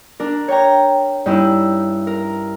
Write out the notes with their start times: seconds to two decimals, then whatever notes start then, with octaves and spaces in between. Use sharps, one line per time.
0.20 D4 A#4
0.48 C#5 G5 A#5
1.26 G2 C#4 D#4 E4
2.07 A#4